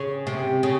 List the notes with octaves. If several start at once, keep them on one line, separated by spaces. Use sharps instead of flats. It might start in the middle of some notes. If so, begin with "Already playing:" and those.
Already playing: C#3
C3
C#3